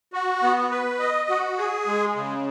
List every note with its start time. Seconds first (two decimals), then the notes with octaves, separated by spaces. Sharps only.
0.13 F#4
0.42 B3
0.71 B4
1.00 D#5
1.29 F#4
1.58 G#4
1.87 G#3
2.16 C#3